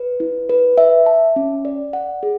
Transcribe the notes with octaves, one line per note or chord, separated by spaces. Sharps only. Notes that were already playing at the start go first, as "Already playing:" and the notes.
Already playing: B4
E4
B4
E5
A5
C#4
D5
F#5
G#4